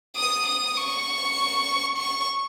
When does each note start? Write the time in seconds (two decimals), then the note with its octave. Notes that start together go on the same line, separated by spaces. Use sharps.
0.17 D#6
0.46 D#6
0.77 C#6
1.98 C#6